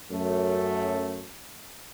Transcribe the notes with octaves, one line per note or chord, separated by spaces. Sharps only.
F#2 A3